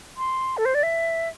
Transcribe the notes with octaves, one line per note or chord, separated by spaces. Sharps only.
C6
A4
C5
D5
E5